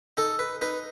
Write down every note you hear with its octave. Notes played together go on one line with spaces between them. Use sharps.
D#4 A4
B4
D#4 B4